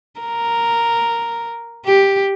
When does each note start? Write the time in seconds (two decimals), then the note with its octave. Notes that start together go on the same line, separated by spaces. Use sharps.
0.20 A#4
1.86 G4